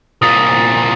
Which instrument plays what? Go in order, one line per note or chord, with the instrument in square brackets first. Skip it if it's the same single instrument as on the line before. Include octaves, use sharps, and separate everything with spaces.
[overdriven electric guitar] C2 A#2 [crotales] D#6 A6